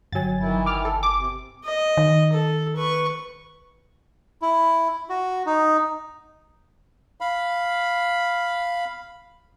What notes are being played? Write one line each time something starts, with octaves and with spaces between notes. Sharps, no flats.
G1 F#3 G#5 A6
D#3 E3 E4
D6 F6
A4
D6
C3
D#5
D#3
A4
B4 C#6
E4
F#4
D#4
F5 B5